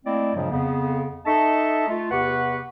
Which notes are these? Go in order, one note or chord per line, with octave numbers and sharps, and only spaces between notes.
A3 A#3 C4 E4 D5 D#5
G2 A#2 C#3 F3 F#3 G#3
F2 C#3 B3
D#4 A4 D#5 E5 A5 C#6
A3 F4
E2 C3 G4 B4 F#5 C#6